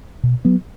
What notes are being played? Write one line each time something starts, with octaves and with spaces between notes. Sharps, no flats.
B2
F#3 B3